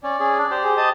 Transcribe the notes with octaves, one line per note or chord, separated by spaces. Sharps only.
C#4 D5
C#4 G#4
D4
G4 C5
G#4
D#5 A5 D#6